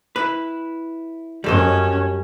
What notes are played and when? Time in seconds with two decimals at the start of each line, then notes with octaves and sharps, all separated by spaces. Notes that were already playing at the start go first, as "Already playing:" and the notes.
0.16 E4 B4
1.44 F#2 G3 C#4 A4 D#5